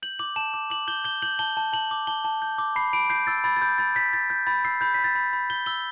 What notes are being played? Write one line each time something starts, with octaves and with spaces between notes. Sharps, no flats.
G6 F#7
D6 F#7
A5 E7
D6
D6 F#7
G6 G7
G6 G7
G6 F#7
A5 G7
A5
A5 F#7
D6
A5 G7
A5
G6
D6
B5 C7
B5 D7
G6 C7
E6 A6
B5 A6
A6
B5 G6
B5 A6
G6 B6
G6 A6
G6
B5 A6
E6 C7
B5 G6
B5 B6
A6
B5
B5
G6 G7
E6 G7